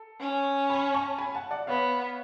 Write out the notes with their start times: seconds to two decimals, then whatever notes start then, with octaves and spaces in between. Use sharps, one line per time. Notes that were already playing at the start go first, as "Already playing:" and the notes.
Already playing: A4
0.20 C#4
0.70 G#5 B5
0.94 A5 C#6
1.18 G#5 B5
1.35 F#5 A5
1.51 D5 F#5
1.67 B3 C#5 F5